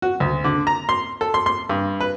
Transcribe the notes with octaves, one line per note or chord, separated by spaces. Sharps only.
F#4
D2
D3
A#5
C6
A4
C6
C6
G2
B4